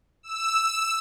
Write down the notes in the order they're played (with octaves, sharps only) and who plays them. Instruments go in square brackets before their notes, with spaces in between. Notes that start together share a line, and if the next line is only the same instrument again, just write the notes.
[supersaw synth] E6